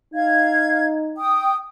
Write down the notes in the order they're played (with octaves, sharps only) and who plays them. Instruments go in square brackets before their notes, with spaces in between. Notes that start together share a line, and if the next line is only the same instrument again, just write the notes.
[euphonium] D#4 [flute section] F5 G#6
[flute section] G5 D#6